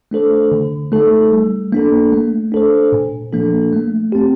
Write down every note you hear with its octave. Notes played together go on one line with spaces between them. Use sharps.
A3 D4 A4 C5
D3
A3 D#4 A4
G3
A#3 D4 A4
A3
D4 A4 C5
A#2
F3 A#3 D4 A4
A3
C4 G4